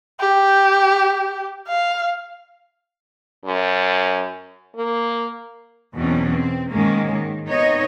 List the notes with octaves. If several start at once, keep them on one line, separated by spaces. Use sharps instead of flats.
G4
F5
F#2
A#3
E2 B2 E3 F#3 C4 C#4
C4
G#2 D#3 G#3 A#3 C#4
D#3
C3 B3 D#4 C#5 D#5